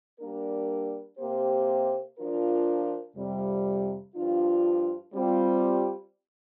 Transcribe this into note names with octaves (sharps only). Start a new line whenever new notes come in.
G3 A#3 D4 A#4
C3 A#3 G4 C5
F3 D4 F4 A#4
F2 C3 G3
G2 F3 D4 F4
G3 C4 F4